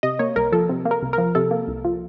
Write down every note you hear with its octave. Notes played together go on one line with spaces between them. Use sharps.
C3 D#5
A#3 C#5
C2 A#4
F3 A4
C3
A#3
A#4
C2
F3 A#4
C3 A4
A#3
C2
F3